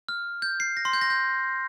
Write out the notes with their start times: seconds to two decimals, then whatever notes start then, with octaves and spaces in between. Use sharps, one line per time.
0.09 F6
0.42 G6
0.60 C7
0.77 A#6
0.85 C6
0.93 G6
1.01 A#6
1.10 G6